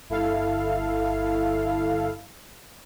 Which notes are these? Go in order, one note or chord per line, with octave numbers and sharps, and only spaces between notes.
G1 E4 A4 F5